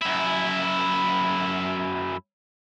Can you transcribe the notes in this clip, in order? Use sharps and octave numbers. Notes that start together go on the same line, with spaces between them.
F#2 E4